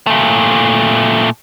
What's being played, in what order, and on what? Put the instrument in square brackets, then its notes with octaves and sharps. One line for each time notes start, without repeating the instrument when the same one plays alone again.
[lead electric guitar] A#2 A3